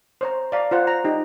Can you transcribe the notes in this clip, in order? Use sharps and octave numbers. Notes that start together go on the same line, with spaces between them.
C5 C#5 A#5
D5 F5 A#5
F4 C5 F#5
A#5
D#4 G4